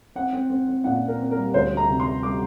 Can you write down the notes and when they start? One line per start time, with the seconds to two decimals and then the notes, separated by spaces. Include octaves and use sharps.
0.15 C4 F#5
0.33 C4
0.50 C4
0.68 C4
0.84 A#2 F#5
1.02 C4
1.08 A#4
1.19 C4
1.31 A#4
1.36 G3
1.54 D2 C5
1.71 D2
1.77 A#5
1.88 C3
2.00 C6
2.05 G3
2.23 G3 D6